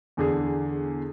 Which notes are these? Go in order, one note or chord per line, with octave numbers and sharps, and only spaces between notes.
E2 D3 G#4